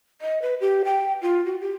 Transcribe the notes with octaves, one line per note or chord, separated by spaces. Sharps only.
D#5
B4
G4
G5
F4
F#4
G4